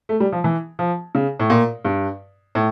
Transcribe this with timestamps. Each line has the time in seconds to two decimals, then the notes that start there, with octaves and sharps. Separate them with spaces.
0.09 A3
0.20 G3
0.32 F3
0.44 E3
0.79 F3
1.15 C#3
1.39 A2
1.50 A#2
1.85 G2
2.55 A2